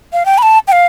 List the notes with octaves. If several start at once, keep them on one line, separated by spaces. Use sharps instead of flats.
F5
G5
B5
A5
G5
F5